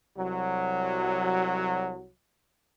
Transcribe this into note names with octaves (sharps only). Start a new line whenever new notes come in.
C2 F#3